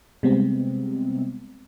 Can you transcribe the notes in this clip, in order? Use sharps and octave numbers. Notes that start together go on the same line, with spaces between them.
C3 G3 G#3 B3 C4